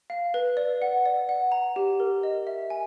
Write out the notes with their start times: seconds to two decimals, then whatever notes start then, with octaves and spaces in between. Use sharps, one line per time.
0.10 F5
0.34 B4
0.57 D5
0.82 F#5
1.05 D5
1.29 F#5
1.52 A#5
1.76 G4
2.00 A#4
2.23 D#5
2.47 E5
2.70 G#5